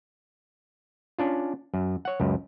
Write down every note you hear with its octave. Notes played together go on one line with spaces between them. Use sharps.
C#4 D4 F4
F#2
C#5 F#5
C#2 F#2